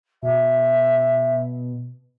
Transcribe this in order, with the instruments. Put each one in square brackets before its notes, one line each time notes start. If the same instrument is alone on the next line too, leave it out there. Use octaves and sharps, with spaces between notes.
[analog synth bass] B2 [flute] E5